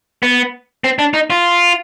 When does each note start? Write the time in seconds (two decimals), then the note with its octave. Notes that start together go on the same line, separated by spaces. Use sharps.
0.23 B3
0.84 C4
0.99 D4
1.14 D#4
1.30 F4